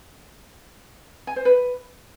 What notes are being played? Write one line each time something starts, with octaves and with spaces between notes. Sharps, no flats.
G#5
C5
B4